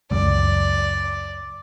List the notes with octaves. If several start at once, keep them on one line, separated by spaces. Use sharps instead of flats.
C#2 F#2 D5